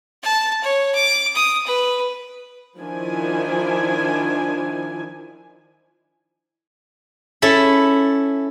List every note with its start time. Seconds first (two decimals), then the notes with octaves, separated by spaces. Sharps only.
0.23 A5
0.63 C#5
0.95 D6
1.35 D#6
1.66 B4
2.78 D#3 F3 D4 E4 G#5
7.42 C#4 E4 A4 E5 A5